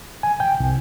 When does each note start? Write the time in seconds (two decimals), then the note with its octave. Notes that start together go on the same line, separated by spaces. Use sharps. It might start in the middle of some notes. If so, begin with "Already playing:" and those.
0.23 G#5
0.40 G5
0.60 C2